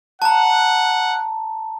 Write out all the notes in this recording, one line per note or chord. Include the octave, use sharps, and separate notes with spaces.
F#5 A5 A#5